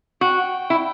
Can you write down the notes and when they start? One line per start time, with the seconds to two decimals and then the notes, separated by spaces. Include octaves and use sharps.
0.21 F#4 G5
0.70 E4